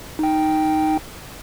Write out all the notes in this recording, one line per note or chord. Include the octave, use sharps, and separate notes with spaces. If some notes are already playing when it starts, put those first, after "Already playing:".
D#4 G5